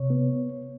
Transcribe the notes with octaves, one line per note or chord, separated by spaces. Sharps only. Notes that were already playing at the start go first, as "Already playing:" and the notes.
Already playing: C3 C#5
B3